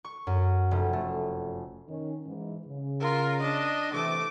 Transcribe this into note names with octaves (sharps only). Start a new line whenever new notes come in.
C#6
F#2
F1
A3
D#3 C#4
G#2 E3
C#3
F4 A#4
D4 D#5
C3 E3 A3 D6